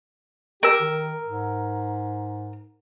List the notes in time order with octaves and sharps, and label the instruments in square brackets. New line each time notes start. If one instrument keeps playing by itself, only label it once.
[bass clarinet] G4 [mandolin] A#4 E6
[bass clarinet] D#3
G#2